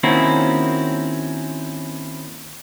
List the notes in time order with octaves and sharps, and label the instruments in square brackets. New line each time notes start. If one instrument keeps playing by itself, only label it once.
[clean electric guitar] D#3 A#3 C4 C#4 E4 F#4